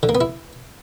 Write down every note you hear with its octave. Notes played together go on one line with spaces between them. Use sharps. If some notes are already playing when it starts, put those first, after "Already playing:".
D3
A#3
B3
E4